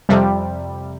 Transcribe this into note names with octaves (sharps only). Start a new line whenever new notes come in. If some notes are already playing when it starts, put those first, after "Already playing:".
F2 C3 G3